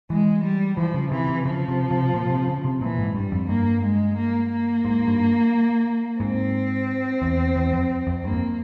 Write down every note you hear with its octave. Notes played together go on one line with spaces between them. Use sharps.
E3 G#3
G3
E3 F3
C#3
C3 E3
C3
C#3 F3
C3
C3
A#2
C3
C#3
C3
A#2 E3
G#2
G2 G3
F2
G2 A#3
G#3
A#3
A#3
G#2
G2
G#2 C4
E2
E2
F2
F2
G2 A#3
F2